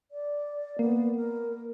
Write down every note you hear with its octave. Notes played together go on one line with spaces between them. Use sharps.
D5
A#3 B3
A#4